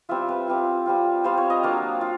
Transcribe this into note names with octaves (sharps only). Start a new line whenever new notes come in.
G3 C4 F4 E5
B4
G3 C4 F4
G3 C4 F4
G3 C4 F4 C5
C#5
D#5
F#3 A#3 D4 F4 F5
F4